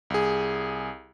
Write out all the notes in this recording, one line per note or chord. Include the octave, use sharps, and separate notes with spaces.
C2 G#4